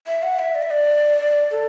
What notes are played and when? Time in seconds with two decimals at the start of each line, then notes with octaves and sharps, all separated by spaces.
0.07 E5
0.23 F#5
0.39 E5
0.55 D5
0.62 E5
0.70 D5
1.51 A4